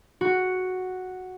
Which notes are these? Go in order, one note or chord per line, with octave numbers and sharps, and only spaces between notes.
F#4